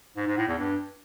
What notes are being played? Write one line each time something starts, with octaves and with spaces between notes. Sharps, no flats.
G#2
G#2
A2
E2
G2